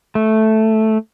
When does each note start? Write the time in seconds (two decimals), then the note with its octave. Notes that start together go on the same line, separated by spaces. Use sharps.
0.15 A3